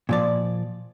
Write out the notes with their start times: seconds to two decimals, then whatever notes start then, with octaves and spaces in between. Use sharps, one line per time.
0.09 A#2 F3 D5